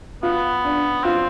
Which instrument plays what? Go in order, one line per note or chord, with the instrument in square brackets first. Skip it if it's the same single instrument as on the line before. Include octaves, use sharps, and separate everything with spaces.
[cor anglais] B3 [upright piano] F4
[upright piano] D4
[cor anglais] C4 [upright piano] F4